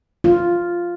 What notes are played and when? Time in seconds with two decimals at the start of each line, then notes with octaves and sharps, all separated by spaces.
0.24 F4